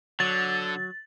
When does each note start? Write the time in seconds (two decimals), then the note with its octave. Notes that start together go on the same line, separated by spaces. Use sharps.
0.20 D3 F#3 A6